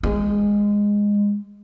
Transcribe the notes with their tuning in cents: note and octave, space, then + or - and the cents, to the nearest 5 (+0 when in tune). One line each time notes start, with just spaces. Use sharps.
G#3 -15